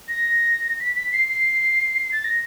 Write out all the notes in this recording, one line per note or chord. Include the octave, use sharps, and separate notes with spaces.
A#6
B6
B6
C7
C7
A6
A#6